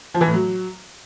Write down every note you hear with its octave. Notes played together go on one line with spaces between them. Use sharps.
F3
E3
A2
F#3